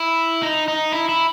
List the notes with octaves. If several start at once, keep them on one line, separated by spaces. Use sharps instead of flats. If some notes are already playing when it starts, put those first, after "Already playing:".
Already playing: E4
D#4
D#4
E4
E4